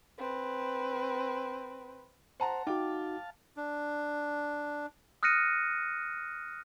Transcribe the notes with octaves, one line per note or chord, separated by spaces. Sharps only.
C4 B4
C5 F#5 A5 A#5
D#4 F#4 F5 G5 A5 D6
D4
D#6 F6 F#6 A#6 C#7 D#7